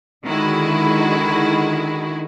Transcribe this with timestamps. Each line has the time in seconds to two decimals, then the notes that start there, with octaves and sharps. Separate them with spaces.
0.25 D3 D#3 G#3 E4 F#4